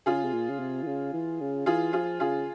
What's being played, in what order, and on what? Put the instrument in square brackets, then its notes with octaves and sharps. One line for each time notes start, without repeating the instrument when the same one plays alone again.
[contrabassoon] C#3 [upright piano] F4 G#4
[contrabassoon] C3
A#2
C#3
C3
E3
C#3
E3
C#3
[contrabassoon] E3 [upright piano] F4 G#4
[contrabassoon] F3 [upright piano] F4 G#4
[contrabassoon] C#3 [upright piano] F4 G#4